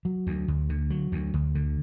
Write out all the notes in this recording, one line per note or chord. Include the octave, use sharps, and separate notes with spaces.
F#3
D2
D2
D3
F#3
D2
D2
D3